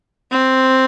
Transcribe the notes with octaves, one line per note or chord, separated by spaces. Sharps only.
C4